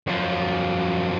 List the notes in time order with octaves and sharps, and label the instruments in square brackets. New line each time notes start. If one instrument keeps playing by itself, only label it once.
[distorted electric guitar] F#2 F3